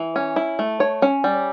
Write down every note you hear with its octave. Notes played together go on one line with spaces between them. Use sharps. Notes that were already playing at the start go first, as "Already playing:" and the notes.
Already playing: E3
C#4
E4
A3
C#5
C#4
G3